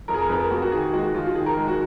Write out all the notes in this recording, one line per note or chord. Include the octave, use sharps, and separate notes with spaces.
F2 A#4
G#4
A#4
F2 B4
A#4
A#3 F#4
F#4
D#3 G#4
G#4
G#3 F#4
F#4
F3 F4
F#4
D#3 G#4
A#4
G#3
F#4